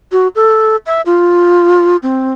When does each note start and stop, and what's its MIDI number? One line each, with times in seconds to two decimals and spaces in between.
0.12 0.28 66
0.35 0.76 69
0.86 1.01 76
1.06 1.97 65
2.03 2.34 60